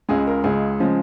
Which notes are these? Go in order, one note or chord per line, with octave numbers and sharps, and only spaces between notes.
C#2 C#3 G#3 G#4
A#4
C#2 C#3 G#3 G#4
C#3 F3 G#3